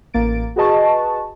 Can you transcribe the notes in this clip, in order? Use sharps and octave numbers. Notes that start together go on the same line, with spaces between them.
A1 A#3 A6 D7
F#4 G#4 B4 D#5 A5 C#6